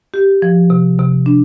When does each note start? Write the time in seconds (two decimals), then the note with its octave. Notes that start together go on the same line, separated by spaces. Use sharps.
0.14 G4
0.42 F3
0.70 C3
0.99 C3
1.26 D4